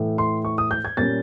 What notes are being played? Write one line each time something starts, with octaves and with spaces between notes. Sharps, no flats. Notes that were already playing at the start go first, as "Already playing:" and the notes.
Already playing: A2 E3 A3
C6
C#6
D#6
G6
G#6
A#2 G3 A#3 C#4 A6